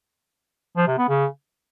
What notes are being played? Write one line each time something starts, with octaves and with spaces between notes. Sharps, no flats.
F3
C3
B3
C#3